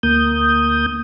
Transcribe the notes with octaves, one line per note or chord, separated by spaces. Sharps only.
D2 A#3 D#6 G6